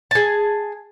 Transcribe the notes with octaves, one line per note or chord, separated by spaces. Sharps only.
G#4 A5